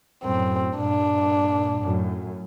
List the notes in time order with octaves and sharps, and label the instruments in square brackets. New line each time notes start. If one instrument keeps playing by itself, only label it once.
[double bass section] F#2 A2 [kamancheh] C4
[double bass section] G2 A#2 [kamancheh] D4
[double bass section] F#2 A2